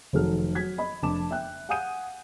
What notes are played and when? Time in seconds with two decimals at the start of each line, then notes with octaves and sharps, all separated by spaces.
0.13 F1 D#3 F#3 D#4 A4 F6
0.55 F#3 G#6 B6
0.78 D#5 B5
1.02 F1 D4 A5 D6 E7
1.31 E5 G5 F#6
1.69 F5 F#5 G#5 D#6 G6 D#7